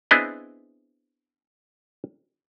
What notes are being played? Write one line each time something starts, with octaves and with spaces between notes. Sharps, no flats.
B3 C4 D4 E4 G#4 D#5